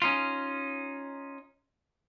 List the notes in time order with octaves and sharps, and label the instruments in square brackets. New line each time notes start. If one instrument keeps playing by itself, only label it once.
[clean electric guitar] C#4 D#4 F4